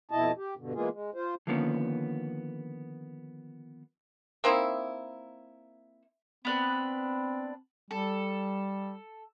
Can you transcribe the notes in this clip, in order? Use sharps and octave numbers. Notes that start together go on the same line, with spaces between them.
F2 B2 E4 D#5 A5
G4
G2 B2 D3
E3 G#3 A#3 B3 F4 G#4
G#3
F4 C5
D3 D#3 F3 A#3 B3 C#4
A#3 C4 D#4 E4
B3 C4 D4 B4
G3 A4